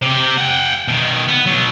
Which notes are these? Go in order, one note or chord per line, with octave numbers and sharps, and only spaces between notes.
C3 G4
F#5 G5
B2 D#3
B3
B2 F#3